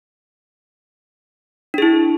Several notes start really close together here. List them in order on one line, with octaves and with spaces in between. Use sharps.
D4 G#4 E4